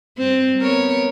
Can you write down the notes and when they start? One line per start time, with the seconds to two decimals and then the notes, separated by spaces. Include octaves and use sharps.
0.18 G2 C4
0.59 B3 A#4 C#5